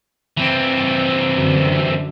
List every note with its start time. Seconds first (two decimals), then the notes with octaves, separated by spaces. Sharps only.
0.37 E3 C4
1.33 F#2 D3